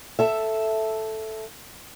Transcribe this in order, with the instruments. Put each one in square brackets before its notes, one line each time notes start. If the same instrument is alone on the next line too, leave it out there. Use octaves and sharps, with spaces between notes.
[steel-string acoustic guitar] A4 E5